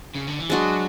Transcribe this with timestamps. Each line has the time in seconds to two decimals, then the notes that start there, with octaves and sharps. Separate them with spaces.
0.15 C#3
0.27 D3
0.39 E3
0.50 F#3 G#3 D4 F#4